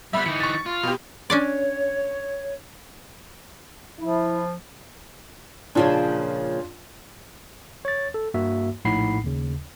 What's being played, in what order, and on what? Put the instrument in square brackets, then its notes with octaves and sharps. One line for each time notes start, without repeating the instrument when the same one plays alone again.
[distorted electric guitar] G3 B3 [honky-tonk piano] E5 B5
[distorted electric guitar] E3 D#4 [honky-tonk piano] C#7
[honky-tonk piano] C#6 A6
[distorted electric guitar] F4
[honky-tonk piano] B2 G4
[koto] C#4 D4 D5 [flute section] C#5
[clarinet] F3 [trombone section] E4
[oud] A#2 C#3 F3 [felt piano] D4 F4 A5
[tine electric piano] C#5 A6
A4
G2 A#3 F#4 E5
A#1 A2 D#4 F#5 B5 C7
D#2 C#3